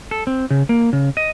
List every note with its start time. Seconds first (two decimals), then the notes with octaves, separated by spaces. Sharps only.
0.11 A4
0.27 C4
0.50 C#3
0.69 A#3
0.93 C#3
1.17 D#5